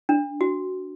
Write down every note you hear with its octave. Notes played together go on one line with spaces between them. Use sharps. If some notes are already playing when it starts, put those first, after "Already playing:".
D4
F#4